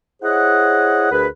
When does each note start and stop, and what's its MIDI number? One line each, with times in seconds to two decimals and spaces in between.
0.23 1.11 64
0.23 1.11 68
0.23 1.11 72
0.23 1.11 73
0.23 1.11 75
0.23 1.11 78
1.12 1.27 38
1.12 1.27 68
1.12 1.27 70
1.12 1.27 71